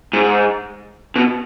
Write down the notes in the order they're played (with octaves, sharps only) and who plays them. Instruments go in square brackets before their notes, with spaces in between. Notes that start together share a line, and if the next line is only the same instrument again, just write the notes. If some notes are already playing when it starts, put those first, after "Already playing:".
[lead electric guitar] G#2
B2